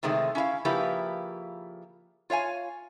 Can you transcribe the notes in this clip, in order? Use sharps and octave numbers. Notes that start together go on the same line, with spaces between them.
A2 C3 D#3 G#3 A3
C#4 E4 E5 F5
C#3 F3 A#3 E4 G4 B4
F4 C#5 F5 G#5